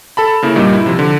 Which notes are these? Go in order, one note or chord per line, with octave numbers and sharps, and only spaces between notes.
A4 A5 B5
C#3 A#3 E4
G2 A#2 G3 D#4
E4
C3 F3
D3